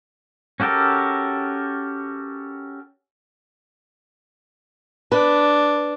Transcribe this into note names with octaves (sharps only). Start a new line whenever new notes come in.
C#4 F#4 G4 A4 A#4
D4 B4